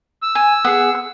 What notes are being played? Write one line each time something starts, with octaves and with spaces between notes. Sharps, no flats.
E6
G#5
B3 G#4 F#5
E6